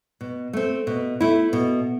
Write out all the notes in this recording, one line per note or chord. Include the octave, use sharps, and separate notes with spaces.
B2
A3 C4
B2
A3 E4
B2